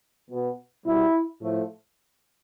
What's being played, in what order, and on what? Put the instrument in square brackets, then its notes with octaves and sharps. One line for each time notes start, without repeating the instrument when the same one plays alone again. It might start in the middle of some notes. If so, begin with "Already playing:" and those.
[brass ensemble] B2 B3
B2 G3 B3 E4
A2 F3 A3